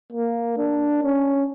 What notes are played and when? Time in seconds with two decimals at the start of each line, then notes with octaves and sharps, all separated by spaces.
0.12 A#3
0.58 D4
1.03 C#4